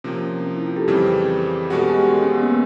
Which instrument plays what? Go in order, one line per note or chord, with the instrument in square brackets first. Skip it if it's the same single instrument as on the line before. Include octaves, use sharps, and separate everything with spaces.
[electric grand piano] C3 F3 A#3 [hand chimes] C#4
[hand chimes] C#4
C#4
E4
F4
G4 A4
[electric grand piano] F2 C#3 E3 G3 C4
[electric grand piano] B2 G#3 C#4 F#4 [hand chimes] G4 A4
[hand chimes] G#4
G4
F#4
C#4
C#4
B3
A#3